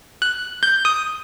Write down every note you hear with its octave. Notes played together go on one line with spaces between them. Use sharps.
F#6
G6
D#6